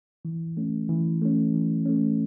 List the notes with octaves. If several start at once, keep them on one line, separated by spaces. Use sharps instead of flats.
E3
A3 C#4
E3
A3 C#4
E3
A3 C#4